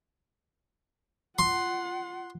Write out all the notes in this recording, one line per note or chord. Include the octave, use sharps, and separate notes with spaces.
F4 F#5 C6